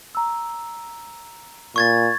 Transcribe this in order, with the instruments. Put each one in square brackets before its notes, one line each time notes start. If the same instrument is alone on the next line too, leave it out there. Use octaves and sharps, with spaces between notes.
[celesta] A#5 E6
[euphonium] A#2 [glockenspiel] C#6 G#6 A6